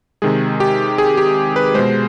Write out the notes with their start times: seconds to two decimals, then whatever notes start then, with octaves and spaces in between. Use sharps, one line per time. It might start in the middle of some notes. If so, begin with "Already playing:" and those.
0.22 C3 D#3 G#3 G#4
0.60 G4
0.98 G#4
1.17 G4
1.56 B4
1.74 B2 G#3 C5